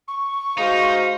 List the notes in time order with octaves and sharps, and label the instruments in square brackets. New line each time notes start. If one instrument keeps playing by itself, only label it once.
[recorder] C#6
[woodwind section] G#3 F#4 C5 [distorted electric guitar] D#4 [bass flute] F5